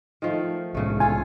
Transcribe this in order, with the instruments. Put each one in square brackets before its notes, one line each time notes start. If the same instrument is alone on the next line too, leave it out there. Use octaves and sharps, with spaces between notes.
[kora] D#3 F3 A3
[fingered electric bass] C2 A2 G#3 [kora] C#3 A3
[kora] F4 A4 [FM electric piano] G#5